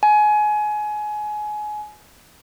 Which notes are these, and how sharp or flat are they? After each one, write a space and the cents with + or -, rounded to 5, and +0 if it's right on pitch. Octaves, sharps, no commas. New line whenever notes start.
G#5 +25